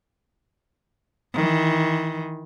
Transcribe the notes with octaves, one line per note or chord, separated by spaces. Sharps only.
D#3 E3